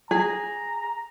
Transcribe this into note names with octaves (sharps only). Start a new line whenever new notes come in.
G#4 A#5